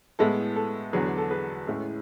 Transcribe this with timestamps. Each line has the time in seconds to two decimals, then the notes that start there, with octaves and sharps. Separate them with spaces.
0.19 A2 G#3 B3 E4 A4
0.56 A4
0.93 E2 D3 F#3 G#4 B4
1.06 G#4
1.18 A4
1.30 G#4 B4
1.67 A2 G#3 C#4 E4